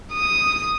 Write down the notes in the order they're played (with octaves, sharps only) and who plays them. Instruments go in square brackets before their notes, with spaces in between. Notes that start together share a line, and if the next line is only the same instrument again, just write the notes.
[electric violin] D#6